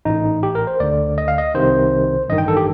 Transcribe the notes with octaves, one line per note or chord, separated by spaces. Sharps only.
A1 A2 D#4
G4
A#4
C5
D2 D3 D5
D#5
F5
D#5
C2 C3 D#3 C5
A1 G2 D#3 D#5
G5
A4
G4